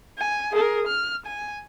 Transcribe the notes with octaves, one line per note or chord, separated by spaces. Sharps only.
G#5
G#4 A#4
F6
G#5